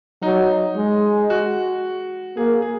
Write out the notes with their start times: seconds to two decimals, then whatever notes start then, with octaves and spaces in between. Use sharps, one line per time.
0.22 F#3 D#4
0.76 G#3
1.30 F#4
2.37 A#3 G#4
2.62 G#4